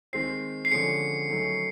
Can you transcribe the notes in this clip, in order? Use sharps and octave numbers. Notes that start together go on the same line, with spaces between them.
D#3 G#3 C4 C7
C7
D3 F3 G#3 C#4 C#7
D#3 F#3 A3 C#4